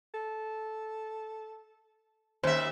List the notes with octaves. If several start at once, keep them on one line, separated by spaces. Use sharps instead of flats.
A4
D#2 C#4 C5 E5